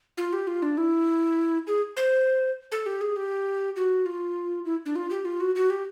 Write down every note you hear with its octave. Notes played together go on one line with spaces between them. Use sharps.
F4
G4
F4
D4
E4
G#4
C5
A4
G4
G#4
G4
F#4
F4
E4
D4
F4
G4
F4
F#4
F#4
G4